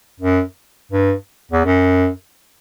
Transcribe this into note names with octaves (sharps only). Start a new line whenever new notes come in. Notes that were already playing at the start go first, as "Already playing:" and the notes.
F#2
G2
E2
F#2